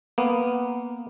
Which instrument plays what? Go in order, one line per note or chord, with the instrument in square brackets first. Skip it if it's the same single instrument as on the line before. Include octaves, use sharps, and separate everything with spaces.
[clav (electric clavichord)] A#3 B3